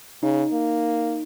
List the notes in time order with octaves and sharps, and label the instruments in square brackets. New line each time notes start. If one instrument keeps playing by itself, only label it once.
[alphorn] C#3 [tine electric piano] D#4
[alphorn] A#3